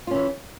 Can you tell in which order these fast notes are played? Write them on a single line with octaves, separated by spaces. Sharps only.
F4 C#4 E3